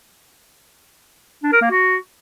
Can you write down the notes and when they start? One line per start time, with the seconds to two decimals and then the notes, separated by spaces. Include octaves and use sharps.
1.43 D4
1.52 A#4
1.62 A#3
1.71 F#4